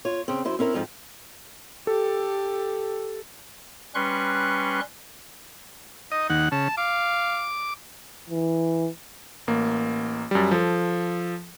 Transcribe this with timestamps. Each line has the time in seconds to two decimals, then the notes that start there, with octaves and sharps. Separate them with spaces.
0.05 F4 C#5
0.28 C#3 C4
0.45 F#2 E4 C5
0.59 C4 C#4 E4 A#4
0.74 F2 G#2 F3
1.87 G4 A4
3.95 G3 C#4 B4 C6 C#6 F#6
6.12 D#4 D#5
6.30 D#2 F#5
6.52 C#3 A5
6.77 F5 D6
8.29 E3
9.47 A1 A#3
10.31 F#2 G3
10.51 F3 A4